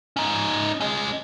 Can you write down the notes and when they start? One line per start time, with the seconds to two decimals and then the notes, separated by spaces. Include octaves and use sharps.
0.17 C#4 D#4
0.81 C#4 D#5